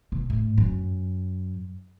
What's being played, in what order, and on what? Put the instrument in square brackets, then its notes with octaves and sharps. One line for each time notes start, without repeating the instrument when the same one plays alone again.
[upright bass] B2
A2
F#2